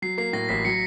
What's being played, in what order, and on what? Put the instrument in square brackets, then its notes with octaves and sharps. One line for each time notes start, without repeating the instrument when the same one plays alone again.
[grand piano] F#3 [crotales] C7
[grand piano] A#3 [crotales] C7
[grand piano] A2 [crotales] A#6
[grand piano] A1 [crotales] B6
[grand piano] F#3 [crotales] C#7